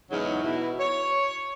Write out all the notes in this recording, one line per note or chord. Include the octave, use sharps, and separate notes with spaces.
E2 G#2 C#3 F#3 D#4 F#4
B2 E4
C#5